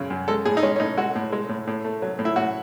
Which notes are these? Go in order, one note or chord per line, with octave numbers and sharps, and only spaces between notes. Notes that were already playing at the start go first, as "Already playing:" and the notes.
Already playing: F#2 C#3
F#2
G#3 A4
A2 G#4
D#4
G#3 C#4
C#4
A2 D#4
G#3 F#4
A2
G#3
A2
A2
A3
F#3
A2
E4
A2 F#4